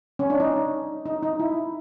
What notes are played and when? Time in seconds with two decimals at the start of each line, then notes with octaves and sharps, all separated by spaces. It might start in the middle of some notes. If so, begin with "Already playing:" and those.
0.19 C#4
0.30 D4
0.40 D#4
1.06 D#4
1.23 D#4
1.40 E4